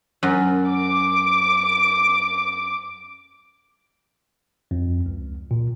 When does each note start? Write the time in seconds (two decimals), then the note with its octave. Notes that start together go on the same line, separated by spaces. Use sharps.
0.23 F#2
0.69 D6
4.71 F2
5.06 C#2
5.51 A#2